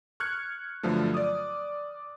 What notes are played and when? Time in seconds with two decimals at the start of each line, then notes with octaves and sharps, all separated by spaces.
0.20 C#6 F6 F#6 G#6 C#7
0.83 G2 D3 F3 F#3 A3
1.14 D5 D6 D#6